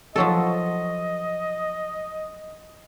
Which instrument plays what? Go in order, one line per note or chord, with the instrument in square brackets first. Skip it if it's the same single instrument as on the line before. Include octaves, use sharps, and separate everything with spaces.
[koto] F3 F#3 A4 [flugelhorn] D#5